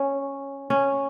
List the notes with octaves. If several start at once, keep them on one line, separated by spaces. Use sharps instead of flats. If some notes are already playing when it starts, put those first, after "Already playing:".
Already playing: C#4
C#4